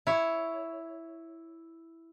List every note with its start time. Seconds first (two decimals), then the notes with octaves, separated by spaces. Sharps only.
0.07 E4 C#5